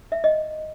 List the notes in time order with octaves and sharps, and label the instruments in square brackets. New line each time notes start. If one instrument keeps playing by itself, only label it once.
[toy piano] E5
D#5